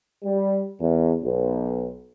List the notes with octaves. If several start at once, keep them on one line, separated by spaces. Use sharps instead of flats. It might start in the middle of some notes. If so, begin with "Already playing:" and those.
G3
E2
B1